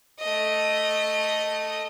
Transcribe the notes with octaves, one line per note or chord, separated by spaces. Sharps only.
A3 D#5